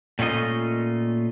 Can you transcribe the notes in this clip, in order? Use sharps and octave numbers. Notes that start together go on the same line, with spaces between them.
A#2 A3 C#4 F4 D#5